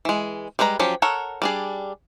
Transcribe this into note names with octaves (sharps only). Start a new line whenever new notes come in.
E3 G#3
G3 G#3 B4 C5 A#5
F3 F#3 C#4 G4
A4 A#4 C#5 F#5
G3 D4 G#4